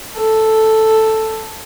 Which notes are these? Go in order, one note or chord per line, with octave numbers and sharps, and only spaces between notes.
A4